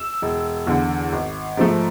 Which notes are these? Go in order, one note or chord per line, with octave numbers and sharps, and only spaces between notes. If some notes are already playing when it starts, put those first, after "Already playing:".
Already playing: E6
E1
E2 D3
G#1
G#2 F3 A3